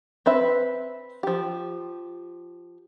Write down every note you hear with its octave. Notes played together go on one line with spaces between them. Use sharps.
C4 B4 E5
F3 G4